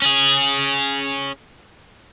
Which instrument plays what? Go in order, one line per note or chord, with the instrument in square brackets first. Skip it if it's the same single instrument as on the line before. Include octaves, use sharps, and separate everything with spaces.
[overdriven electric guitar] C#4 G#4